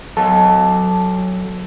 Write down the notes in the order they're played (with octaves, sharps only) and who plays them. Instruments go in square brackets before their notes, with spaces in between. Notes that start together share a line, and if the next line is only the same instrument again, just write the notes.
[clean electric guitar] F#3 A4 A5